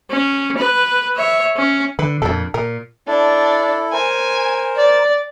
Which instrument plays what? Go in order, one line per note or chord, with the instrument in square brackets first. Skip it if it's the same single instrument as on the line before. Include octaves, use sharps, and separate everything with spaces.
[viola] C#4
B4
C#5 E5
C#4
[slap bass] D3 [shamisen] B4
[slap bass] F2 A#2 [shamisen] D4 A4
[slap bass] A#2 [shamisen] A#4
[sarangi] D4 [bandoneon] E4 A4
[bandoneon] A#4 C5 [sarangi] G#5
[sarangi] D5